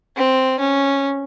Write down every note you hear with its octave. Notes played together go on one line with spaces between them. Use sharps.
C4
C#4